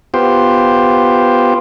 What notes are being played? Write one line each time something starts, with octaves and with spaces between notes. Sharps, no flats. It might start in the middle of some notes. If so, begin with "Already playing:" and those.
B3 F4 G4 C5